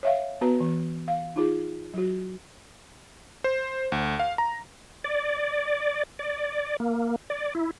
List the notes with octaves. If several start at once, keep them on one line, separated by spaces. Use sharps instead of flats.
C#5 E5 F5
B3 F#4 B4 A#5
E3
F5
D#4 F4 G#4
F#3 F#4
C5
D2
F5
A#5
D5
D5
A#3
D5
E4